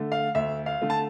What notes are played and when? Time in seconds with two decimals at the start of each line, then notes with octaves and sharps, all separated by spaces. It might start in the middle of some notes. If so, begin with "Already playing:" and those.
Already playing: D3 A3
0.12 F5
0.35 D2 E5
0.66 F5
0.82 D3 A3
0.90 A5